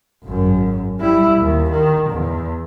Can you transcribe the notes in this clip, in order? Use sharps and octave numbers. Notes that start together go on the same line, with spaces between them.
G#1 F#2
G3 E4
D#2
D#3
E2